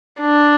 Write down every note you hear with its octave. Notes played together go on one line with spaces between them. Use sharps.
D4